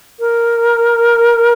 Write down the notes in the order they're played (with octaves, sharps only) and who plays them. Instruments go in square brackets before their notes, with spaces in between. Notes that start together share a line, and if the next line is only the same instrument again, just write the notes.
[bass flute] A#4